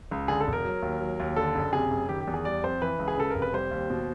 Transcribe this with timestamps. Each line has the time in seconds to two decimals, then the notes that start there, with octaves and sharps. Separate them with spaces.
0.11 C#2
0.28 D3 G#4
0.41 A4
0.47 E1
0.53 A#4
0.65 F#3
0.82 D#2
1.00 F#3
1.20 D#2
1.36 D3 A4
1.55 F#1
1.73 C3 G#4
1.91 F#1
2.09 D#3 G4
2.21 G4
2.27 E2
2.34 G#4
2.45 G3 D5
2.64 F2 C5
2.82 E3 B4
2.99 C#2
3.08 G#4
3.18 C#3 A4
3.30 A#4
3.35 F1
3.42 B4
3.53 G3 C5
3.71 D#2
3.90 B2